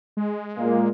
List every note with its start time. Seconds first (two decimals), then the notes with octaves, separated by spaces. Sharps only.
0.17 G#3
0.58 A#2 A#3